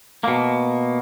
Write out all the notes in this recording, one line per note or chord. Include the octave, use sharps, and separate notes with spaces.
B2 A#3